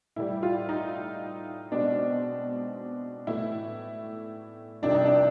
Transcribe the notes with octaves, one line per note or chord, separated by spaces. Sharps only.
A2 E3 G3 E4
F4
D#4
B2 G#3 C4 D4
A2 E3 A3 E4
F2 C3 D#3 G3 D4
D#4
D4